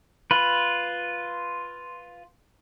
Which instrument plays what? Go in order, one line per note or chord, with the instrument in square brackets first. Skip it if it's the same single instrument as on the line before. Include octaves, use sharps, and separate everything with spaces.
[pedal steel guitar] F4 B4